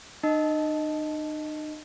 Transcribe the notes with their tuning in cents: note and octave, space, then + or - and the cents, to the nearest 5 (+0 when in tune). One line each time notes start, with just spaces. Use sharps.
D#4 -45 D#5 +0 A5 -10